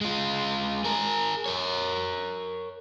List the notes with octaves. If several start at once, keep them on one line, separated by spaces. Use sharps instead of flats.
G#3 F4
G#4 A#4
A#4 C#5